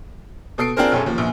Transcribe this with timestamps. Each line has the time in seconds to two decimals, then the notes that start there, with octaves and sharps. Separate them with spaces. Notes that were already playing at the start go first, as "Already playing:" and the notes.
0.58 B2 A4 D#6 C7 D7
0.76 C4 D4 F4 G#4 A#4 C5
0.92 B1 F#2 C#4 G#4 A4
1.06 D#2 F3
1.18 A#1 E2